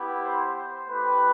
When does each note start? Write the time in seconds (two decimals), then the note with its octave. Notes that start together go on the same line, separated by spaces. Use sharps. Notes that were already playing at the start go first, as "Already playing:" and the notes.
Already playing: B3 E4 G4
0.22 C5
0.55 C5
0.88 A3 E4 G4 B4